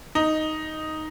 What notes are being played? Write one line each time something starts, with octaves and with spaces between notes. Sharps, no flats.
D#4